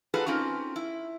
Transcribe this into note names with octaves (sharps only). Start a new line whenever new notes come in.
F4 F#4 G#4 A4 B4
C4 C#4 D#4 F4
E4